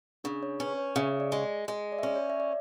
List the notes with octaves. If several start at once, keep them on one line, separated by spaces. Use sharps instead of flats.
C#3 D4
C#5
C#4 B4
C#5
C#3 E5
D5
G#3
G#3
D5
E5
C#4 D5
C#5
E5
D5